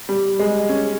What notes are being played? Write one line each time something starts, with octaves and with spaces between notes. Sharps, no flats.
G3
G#3
C#4